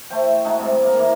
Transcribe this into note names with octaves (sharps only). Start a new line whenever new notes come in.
A3 E4 C5 G5
G#3 A3 D#4 F#4
C3 G3 G#3
A#3 A#4
E3 A#3